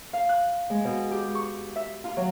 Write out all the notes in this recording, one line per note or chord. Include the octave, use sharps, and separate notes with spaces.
F5
F#6
G#3
B2
G4
C#6
E5
F4
F#3